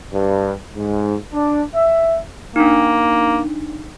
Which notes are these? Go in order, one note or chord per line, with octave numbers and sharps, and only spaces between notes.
G2
G#2
D4
E5
A#3 D4 D#4